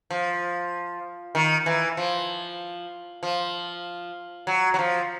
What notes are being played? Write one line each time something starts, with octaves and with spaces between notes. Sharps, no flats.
F3
D#3
E3
F3
F3
F#3
F#3
F3